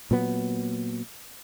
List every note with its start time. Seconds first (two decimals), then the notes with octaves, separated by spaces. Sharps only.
0.11 A#2 F#3 B3